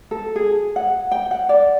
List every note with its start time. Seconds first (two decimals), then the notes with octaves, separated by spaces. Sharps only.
0.11 A4
0.36 G#4
0.76 F#5
1.12 G5
1.31 F#5
1.49 D5